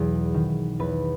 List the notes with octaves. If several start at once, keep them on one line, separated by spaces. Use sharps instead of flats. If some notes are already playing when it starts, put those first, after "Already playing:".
Already playing: B1 E2 F#3 G#4
D#3
E2 B4